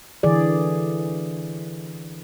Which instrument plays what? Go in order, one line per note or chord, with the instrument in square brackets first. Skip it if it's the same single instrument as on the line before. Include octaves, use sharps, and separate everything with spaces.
[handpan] D3 E3 G#4 D5